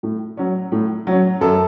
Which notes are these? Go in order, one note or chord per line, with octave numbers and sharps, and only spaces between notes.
A2
F#3 C#4
A2
F#3 C#4
F#2 A4